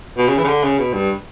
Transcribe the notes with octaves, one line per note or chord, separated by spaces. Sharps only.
B2
C#3
E3
C#3
D3
C#3
B2
G2